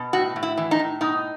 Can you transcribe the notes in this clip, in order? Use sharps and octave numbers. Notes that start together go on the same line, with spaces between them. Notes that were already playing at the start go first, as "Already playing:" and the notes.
Already playing: B2
A2 F#4
A2
E4
E3
D#4
A2
B2 D#4